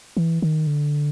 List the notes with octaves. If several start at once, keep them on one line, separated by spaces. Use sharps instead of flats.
E3
D#3
D3